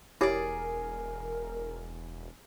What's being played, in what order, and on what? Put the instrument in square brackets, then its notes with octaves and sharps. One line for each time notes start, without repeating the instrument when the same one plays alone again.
[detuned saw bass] E1 [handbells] E4 G4 C#5 [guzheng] G#4 D5 [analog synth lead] A#4